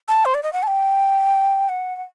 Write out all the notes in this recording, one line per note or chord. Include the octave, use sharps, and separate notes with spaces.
A5
C5
D5
D#5
F#5
A5
G5
F#5
F#5